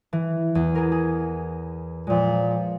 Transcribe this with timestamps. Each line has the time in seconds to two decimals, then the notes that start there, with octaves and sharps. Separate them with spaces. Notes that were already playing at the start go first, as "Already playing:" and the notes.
0.13 E3
0.55 E2
0.75 G#4 A#4
0.92 G#4
2.07 A#2 F3 G#3